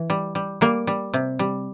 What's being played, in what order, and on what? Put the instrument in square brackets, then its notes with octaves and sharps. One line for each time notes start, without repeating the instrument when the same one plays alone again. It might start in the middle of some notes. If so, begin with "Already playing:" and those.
Already playing: [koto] E3
G3
G3
G3 A#3
G3
C3
G3